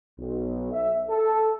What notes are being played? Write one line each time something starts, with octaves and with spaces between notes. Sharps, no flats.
B1
E5
A4